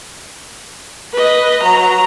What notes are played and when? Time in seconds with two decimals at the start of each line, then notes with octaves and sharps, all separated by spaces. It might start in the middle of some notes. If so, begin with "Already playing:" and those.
1.13 B4 D#5
1.63 F#3 A#5